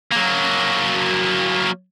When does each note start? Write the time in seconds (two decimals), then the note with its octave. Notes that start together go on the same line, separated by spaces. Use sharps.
0.12 F#3 A#3